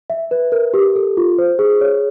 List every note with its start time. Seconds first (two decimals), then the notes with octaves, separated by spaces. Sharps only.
0.10 E5
0.31 B4
0.52 A#4
0.74 G4
0.96 A4
1.17 F4
1.38 C5
1.59 G#4
1.81 C#5